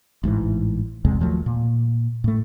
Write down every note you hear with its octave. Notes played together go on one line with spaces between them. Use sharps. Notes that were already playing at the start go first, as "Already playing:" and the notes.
A1 G#2 D#3 E3
B1 E2 C3 G#3
D#2 F3 F#3 A3
A#2
A2 A3